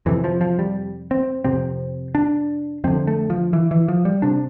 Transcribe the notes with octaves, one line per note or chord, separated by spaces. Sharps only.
F2 C3 E3
F3
F3
G3
C4
F2 C3 C4
D4
F2 D3 C4
A3
F3
E3
E3
F3
G3
C3 D4